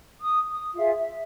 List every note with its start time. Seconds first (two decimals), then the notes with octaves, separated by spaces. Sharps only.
0.20 D#6
0.50 D#6
0.75 F4 G#4 E5 F5
0.96 E5